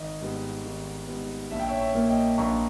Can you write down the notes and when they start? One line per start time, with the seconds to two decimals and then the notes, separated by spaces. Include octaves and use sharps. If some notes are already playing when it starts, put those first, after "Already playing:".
Already playing: G#1 D#5
0.21 G#2 G3 B3
0.64 G#1
1.07 G#2 G3 B3
1.51 A#1 E5
1.60 G5
1.68 C#5 E5
1.79 C#5 E5
1.95 A#2 A#3
2.09 D#5 G5
2.38 A#1 A#5 C#6